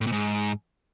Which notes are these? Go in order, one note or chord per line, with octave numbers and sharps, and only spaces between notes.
A2
A#2
G#2